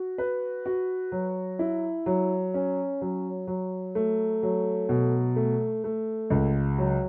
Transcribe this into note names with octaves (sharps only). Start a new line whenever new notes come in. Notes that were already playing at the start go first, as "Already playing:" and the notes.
Already playing: F#4
B4
F#4
F#3
E4
F#3
C#4
F#3
F#3
A3
F#3
B2
A3
A3
C#2
F#3